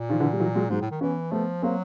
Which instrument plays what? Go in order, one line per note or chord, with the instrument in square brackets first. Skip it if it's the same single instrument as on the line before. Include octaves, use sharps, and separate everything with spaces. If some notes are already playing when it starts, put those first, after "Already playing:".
Already playing: [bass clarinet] A#2
[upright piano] D#3 F3
D3 E3
G3
E3 F#3
F#3 G#3
[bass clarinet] G#2 [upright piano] F#3 G#3
[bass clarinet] A2
D#3
[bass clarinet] E3 [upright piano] B3 C#4
[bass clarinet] F3 [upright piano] A3 B3
[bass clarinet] F#3 [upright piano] A#3 C4